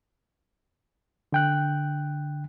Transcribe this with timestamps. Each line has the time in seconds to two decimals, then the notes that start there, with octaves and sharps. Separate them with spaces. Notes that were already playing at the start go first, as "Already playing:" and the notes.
1.32 D3 G5 F#6